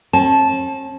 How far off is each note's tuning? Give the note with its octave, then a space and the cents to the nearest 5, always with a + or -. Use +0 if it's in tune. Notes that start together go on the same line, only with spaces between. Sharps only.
C#4 -45 A5 -15